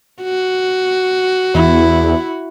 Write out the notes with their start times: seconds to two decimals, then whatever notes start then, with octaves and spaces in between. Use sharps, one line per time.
0.23 F#4
1.55 E2 E4